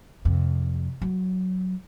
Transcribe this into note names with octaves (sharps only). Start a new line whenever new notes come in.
F2 C3
F#3